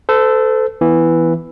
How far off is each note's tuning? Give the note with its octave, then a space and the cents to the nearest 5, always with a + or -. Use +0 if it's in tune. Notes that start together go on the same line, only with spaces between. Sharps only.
A4 +0 C5 -40
E3 +0 B3 +0